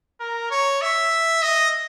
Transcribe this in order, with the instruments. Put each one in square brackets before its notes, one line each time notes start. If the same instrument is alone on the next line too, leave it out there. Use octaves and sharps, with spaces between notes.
[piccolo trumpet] A#4
C#5
E5
D#5